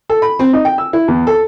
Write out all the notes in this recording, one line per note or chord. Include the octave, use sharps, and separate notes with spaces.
A4
B5
C4
D#4
G5
E6
E4
E2
A4